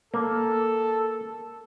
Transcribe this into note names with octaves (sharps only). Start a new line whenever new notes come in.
A#3 A4